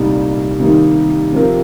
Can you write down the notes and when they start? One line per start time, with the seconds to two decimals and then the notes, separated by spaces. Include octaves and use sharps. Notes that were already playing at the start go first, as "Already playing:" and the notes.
Already playing: C2 A#2 G3 D#4
0.60 C3 D#3 G3 A#3 D#4
1.32 C3 F3 C4 G4 A#4